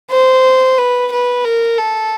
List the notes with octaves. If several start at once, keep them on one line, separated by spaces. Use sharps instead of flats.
C5
B4
B4
A#4
A4